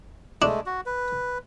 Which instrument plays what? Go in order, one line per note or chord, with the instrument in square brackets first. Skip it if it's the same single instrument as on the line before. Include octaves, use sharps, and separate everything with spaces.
[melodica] G#3 A3 [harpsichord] D4
[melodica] F#4
B4